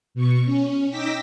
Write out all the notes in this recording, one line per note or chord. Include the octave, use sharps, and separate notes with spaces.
B2 C#6
C#4
D#4 G5 D6 E6 A#6 B6